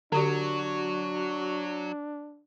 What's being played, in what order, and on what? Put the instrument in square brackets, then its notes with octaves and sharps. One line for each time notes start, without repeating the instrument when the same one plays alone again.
[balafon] D3 G4 D5 [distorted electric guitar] F#3 [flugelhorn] D4 [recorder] F#4